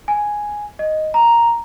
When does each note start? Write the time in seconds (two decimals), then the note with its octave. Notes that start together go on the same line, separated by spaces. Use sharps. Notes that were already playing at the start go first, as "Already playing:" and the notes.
0.08 G#5
0.79 D#5
1.14 A#5